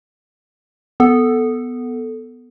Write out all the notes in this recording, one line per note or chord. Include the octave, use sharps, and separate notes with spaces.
B3 A4